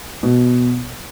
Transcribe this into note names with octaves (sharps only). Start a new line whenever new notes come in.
B2